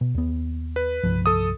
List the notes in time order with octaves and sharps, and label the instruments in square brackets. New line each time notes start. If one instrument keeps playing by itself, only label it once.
[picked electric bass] B2
D#2 B3
[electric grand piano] B4
[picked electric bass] C2 G2 F3
[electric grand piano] A4 D#6